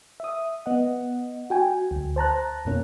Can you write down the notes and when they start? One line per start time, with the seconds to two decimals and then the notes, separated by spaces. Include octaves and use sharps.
0.20 E5 D#6
0.66 B3 D#5 F#5
1.50 F#4 G5 G#5
1.91 D2
2.16 C5 A5 A#5 F#6
2.65 F2 B2 A#3 C#4